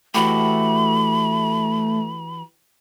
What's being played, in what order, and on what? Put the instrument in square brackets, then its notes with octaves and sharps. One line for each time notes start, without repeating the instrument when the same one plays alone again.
[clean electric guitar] E3 F#4 G4 [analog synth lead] A3 [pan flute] B5